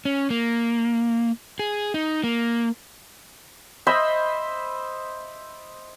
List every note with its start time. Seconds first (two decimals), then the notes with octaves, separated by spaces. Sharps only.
0.05 C#4
0.30 A#3
1.59 G#4
1.94 D#4
2.24 A#3
3.87 C5 D#5 E5 B5